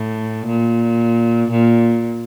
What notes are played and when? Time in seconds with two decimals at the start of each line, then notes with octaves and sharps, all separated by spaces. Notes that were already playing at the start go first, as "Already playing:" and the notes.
Already playing: A2
0.46 A#2
1.51 A#2